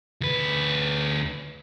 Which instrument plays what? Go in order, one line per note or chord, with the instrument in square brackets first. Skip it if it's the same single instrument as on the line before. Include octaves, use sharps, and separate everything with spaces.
[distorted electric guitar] D2 B4